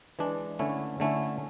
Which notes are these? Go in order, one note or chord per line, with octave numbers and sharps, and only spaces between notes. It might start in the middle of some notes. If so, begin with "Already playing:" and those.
E3 G#3 D4
D3 A3 C#4 E4
D3 A3 C#4 E4